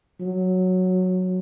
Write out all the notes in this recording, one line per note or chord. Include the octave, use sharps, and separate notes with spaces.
F#3